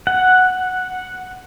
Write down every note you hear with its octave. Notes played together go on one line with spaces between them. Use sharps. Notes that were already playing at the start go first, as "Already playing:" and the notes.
F#5